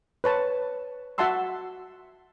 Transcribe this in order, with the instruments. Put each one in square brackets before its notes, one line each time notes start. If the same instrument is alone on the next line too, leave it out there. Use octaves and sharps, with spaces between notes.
[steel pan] B4 C#5 A5
F#4 E5 F#5 A5 C6 E6